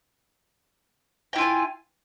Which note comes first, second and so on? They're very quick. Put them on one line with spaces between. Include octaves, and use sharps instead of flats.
G5 E4 F4 G#5